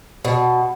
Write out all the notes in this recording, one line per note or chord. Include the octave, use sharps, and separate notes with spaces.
B2